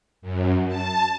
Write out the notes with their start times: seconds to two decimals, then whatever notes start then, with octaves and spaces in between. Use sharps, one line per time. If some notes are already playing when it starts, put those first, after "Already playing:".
0.22 F#2
0.68 A5